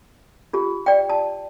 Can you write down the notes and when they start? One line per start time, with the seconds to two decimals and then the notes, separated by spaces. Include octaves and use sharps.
0.53 F4 G4
0.86 D5 G5
1.09 A5